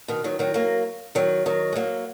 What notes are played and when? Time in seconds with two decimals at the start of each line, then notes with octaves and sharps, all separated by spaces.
0.08 B2 D#3
0.24 D#3 F#3
0.39 D#3 F#3
0.54 F#3 A#3
1.15 D#3 F#3
1.46 D#3 F#3
1.73 G#3
1.75 F#3 A#3